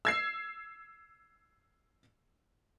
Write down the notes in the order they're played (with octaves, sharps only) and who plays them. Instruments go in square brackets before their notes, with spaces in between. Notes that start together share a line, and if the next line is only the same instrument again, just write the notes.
[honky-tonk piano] E6 G#6 C7